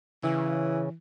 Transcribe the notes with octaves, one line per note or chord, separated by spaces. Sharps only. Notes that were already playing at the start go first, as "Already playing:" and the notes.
C#3 E3